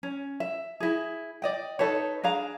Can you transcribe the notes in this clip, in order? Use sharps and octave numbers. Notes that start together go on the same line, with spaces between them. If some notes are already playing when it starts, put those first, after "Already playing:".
C#4
E5
E4 G#4
D5 D#5 G5
D#4 A4 B4 C#5
D4 G#4 F5 A#5